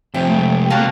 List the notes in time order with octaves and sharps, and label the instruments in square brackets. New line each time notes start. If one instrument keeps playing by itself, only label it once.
[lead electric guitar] F2 C3 [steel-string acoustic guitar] G4 [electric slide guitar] C5 E5
[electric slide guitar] G#3 A3
[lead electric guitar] C3 A5 [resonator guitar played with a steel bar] A#3 F#4